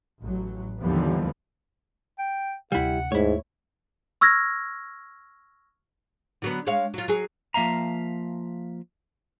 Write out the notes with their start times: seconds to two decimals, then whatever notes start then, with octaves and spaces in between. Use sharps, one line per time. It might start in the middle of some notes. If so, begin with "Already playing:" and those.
0.21 A1 F#3
0.80 D#2 D3 E3 F3 G3 B3
2.19 G5
2.72 D2 C3 G3 E4 F#5
3.12 D#2 G#2 G#3 A3 E4 C#5
4.21 C#6 E6 F6 G#6 A#6
6.42 D3 F#3 B3
6.67 G#3 C#5 F5
6.94 F#3 F4
7.08 F#3 G#4
7.54 F3 A#3 E5 F5 A#5